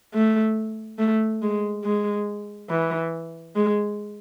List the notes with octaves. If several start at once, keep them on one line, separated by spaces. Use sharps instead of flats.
A3
A3
G#3
G#3
E3
G#3